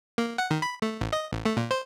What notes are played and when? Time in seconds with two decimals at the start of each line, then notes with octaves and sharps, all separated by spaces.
0.18 A#3
0.38 F#5
0.51 D#3
0.62 B5
0.82 A3
1.01 A1
1.13 D#5
1.32 A1
1.45 A3
1.57 A#2
1.71 C5